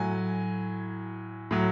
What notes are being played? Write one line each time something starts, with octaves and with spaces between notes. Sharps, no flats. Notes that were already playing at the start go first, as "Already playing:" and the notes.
Already playing: A2 F#3 G#5
A2 F#3